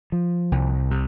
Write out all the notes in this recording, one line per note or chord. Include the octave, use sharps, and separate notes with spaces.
F3
C2
C3